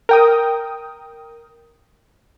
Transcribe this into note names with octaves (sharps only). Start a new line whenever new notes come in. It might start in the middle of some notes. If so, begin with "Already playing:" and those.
A#4 G5 D#6